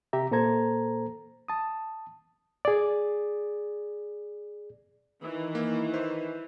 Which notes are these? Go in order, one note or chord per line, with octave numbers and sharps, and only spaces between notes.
C3 G4 E5 A#5
A#2 A#3 A4 C5 A#5 G#6
A5 D#6
G#4 D5
D#3 E3
A#3
B4 C5